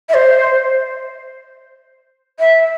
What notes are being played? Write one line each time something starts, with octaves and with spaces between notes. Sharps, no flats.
E5
C5
E5